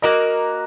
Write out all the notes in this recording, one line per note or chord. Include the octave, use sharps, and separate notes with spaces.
A#3 F#4 A#4 D#5